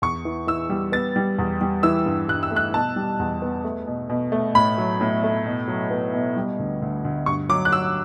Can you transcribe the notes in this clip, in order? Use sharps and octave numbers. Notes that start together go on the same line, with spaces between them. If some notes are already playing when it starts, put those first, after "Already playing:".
E2 C#6
E3
E3 E6
G3
B3 A6
G3
E2
G3
E3 E6
G2
G2 F#6
E6
A3
F#6
B2 A5
G3
E2
B3
A3
B2
B2
A3
A2 B5
F#3
A2
A3
B2
F#3
B3
B2
G3
D2
D2
D2
G2 C#6
F#3 D6
F#6
F#3 E6